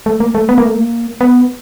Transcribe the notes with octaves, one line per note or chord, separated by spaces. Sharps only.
A3
A#3
A3
B3
A#3
A3
A#3
B3